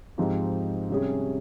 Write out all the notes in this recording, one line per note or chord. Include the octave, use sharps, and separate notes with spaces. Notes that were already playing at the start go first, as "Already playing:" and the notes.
G#2 F3 C4 D#4 G4
C3 G3 C#4 G#4